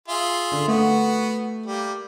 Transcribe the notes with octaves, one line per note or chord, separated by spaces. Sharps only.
F4 G#4 E5
D3
A3 B3 F#4
G3 A#3 G4